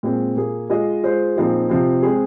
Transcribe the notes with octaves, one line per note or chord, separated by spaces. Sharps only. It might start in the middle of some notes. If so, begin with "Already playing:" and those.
A#2 G#3 C4
A#2 A#3 G#4
G#3 F4 G#4 D#5
G#3 F4 C5
A#2 F3 C4 D#4 G#4
C3 F3 C4
G#3 C4 G#4